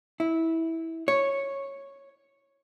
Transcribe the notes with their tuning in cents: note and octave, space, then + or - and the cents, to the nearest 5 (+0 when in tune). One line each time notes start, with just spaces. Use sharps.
E4 -15
C#5 -5